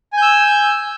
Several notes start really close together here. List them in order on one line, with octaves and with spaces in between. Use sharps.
G#5 G6 E6